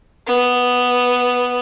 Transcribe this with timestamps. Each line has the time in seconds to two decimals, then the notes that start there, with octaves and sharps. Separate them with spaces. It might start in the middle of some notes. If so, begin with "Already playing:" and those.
0.27 B3